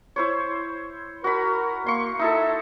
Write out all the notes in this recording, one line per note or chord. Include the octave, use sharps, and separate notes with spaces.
E4 C5 C#5
F#4 A#4 B5
A#3 C6 C#6
D#4 E4 A4 E5